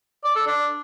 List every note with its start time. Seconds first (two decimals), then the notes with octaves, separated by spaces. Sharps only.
0.25 D5
0.36 A4
0.47 D4